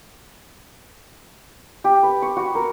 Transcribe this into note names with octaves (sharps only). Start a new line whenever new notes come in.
G4
B4
C#6
F#4
A#4